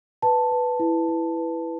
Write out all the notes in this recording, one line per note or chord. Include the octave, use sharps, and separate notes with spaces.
B4 A5
B4
E4
E4
B4